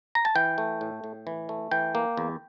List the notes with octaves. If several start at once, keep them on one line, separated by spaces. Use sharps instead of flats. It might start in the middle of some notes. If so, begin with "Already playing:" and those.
A#5
A5
E3 G5
A3
A2
A2
E3
A3
E3 G5
A#3
E2